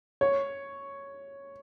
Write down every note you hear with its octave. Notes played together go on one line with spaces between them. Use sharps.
C#5